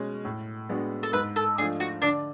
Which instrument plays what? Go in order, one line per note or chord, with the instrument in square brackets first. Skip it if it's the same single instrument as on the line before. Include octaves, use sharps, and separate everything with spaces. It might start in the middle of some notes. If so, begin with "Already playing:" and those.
Already playing: [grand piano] B2 G#3 C#4
A2
G#3 B3 D4 F#4
[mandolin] A4
[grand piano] G#2 [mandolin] B4
[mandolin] A4
[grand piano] F3 A3 D4 [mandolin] G#4
[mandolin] F#4
[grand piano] D3 [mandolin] D4